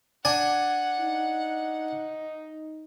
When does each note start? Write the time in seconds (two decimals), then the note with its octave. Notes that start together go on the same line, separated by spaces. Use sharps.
0.25 D4 F#5 G#5
1.00 D#4